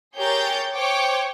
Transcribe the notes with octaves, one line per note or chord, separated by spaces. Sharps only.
G4 G#4 A#4 C#5 G6 A6
C5 C#5 G5 C#6 D6